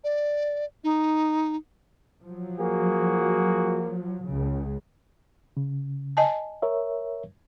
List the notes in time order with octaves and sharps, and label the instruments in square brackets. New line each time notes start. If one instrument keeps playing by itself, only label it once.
[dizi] D5
D#4
[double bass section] F3 F#3
[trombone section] A#3 F#4 G#4
[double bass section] C#2 C#3
[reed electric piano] C#3
[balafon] D#5 G#5 A5
[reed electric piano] A#4 C#5 E5